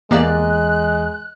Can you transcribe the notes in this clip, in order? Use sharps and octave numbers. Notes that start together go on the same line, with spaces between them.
E2 E3 G#3 A#3 G4 D5 A#5 F#6